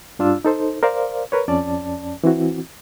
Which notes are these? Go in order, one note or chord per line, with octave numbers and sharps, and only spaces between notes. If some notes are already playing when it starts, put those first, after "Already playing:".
G2 D4 F4 E6
D#4 A4 C5
A#4 C5 D5 F5
A#4 B4 C#5
F2 C#4 D5 A5
E3 C4 E4 F#4